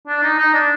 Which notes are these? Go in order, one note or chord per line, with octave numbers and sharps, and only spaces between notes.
D4
D#4
D#4
D4